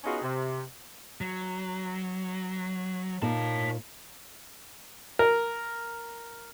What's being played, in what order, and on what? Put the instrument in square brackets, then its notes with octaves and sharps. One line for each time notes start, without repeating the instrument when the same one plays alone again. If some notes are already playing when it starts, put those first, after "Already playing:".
[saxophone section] B3 C#4 D#4 F4 F#4 G#4
C3
[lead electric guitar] F#3
[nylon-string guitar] A#2 A#3 D#4 [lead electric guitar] C#5 A5
[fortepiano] A#4